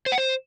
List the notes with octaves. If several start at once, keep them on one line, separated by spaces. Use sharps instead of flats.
C5
F#5
C5